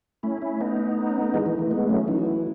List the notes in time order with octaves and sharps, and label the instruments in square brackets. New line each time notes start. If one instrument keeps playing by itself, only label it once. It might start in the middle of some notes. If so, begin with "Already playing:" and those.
[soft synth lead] A3 [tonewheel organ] C#4 E4
[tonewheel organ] C#4 E4
[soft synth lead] A3 [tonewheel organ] B3 D#4
[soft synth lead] A3
C#4
A3
[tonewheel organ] E3 G#3 [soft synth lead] A3
[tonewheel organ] E3
[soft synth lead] A3
[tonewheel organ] E3
[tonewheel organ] G#3 B3 [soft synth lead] A3
[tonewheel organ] F#3 A3 [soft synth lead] C#4
[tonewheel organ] E3 [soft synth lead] D#4
[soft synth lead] F#4
E4